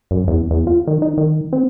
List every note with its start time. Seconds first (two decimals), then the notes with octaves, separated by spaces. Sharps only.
0.11 F#2
0.28 E2
0.51 E2
0.67 F4
0.87 D#3
1.02 D#4
1.18 D#3
1.53 C4